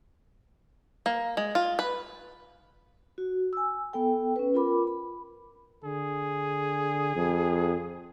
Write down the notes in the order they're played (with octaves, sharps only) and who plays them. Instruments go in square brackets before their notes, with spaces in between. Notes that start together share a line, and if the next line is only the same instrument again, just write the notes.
[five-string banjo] A#3
G#3
F4
B4
[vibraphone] F#4
G#5 E6
B3 A4 G5
C#4 B4
F4 A#4 B5 D6
B5
[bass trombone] D3 [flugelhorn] G#4
[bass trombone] F2